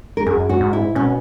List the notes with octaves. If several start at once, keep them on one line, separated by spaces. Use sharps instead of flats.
A#4
F#2 G#4
F#4
G#2
E4
B2 C#4